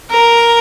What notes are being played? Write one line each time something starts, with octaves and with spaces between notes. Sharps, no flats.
A#4